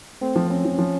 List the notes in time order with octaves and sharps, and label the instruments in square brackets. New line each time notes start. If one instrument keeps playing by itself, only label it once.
[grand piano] A3 [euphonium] C4
[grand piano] F3
[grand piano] C4 [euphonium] C#4
[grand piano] F3
F3